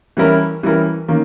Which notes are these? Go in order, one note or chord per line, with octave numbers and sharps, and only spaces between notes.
E3 G3 C#4 E4 A#4
E3 G3 C#4 E4 A#4
D#3 A#3 C#4